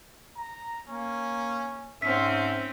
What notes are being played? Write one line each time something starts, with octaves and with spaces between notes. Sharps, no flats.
A#5
A#3 C#4
G#2 C4 C#4 E5 B6